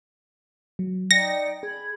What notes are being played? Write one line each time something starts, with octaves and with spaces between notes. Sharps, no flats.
F#3
D#4 D5 G5 A#6 C#7
G#4 B5 G#6